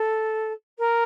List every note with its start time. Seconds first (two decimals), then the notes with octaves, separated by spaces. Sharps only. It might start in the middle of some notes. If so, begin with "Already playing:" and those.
Already playing: A4
0.78 A#4